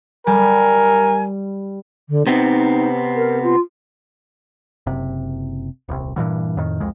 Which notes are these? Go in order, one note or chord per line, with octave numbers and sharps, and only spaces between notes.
G3 A#4 G#5
D3
C3 B3 C4 D#4
A#4
F4
F#1 C3
D#1 C2
G2 A#2 E3 F#3
F2 A2 D#3
C2 F2 G#3